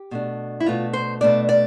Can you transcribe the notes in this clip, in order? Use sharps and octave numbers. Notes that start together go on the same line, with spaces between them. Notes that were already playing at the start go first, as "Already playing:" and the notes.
Already playing: G4
B2 A3 D4
E4
B2 A3 D4 F4
C5
B2 A3 D4 D5
D5